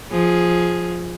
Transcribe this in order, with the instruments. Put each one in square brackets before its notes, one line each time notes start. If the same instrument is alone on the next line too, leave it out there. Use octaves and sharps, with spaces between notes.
[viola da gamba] F3 G#4